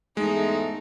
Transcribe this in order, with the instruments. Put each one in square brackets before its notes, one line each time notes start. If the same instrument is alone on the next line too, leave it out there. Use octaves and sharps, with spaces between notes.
[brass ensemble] E2 G#2 A3 [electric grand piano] G#3 [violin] D#4